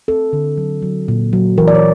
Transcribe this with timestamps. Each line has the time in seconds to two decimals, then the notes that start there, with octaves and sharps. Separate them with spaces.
0.08 C4 A4
0.33 D3
0.58 F#3
0.82 F#3
1.08 A#2
1.33 F#3
1.58 E3 A#4
1.68 D5
1.75 C#5